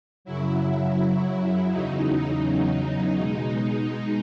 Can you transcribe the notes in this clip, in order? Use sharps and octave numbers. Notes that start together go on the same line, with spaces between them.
F#2 C#3 F#3 E4
E2 C#3 F#3 D#4
D#4
D#4
B2 G#3